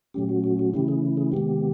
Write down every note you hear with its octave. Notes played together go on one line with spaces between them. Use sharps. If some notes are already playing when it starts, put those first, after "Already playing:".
A#2 F#3 A3 C#4 G4
F#4
F#4
F#4
C#3 E3 A3 C#4 E4 G4
G#4
G#4
C3 D#3 G#3 B3 G4